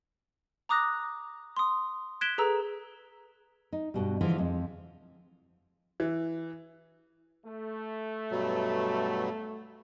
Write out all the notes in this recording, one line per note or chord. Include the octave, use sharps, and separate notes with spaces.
A#5 D6 D#6 F#6 A#6
C6 D#6
F#6 G#6 B6 D7 E7 G7
G#4 A4 B4 A#5 E6
D#4
G2 B2 G3
D3 E3 F3 G#3 E4
F2 G#3
E3
A3
G2 B2 F#3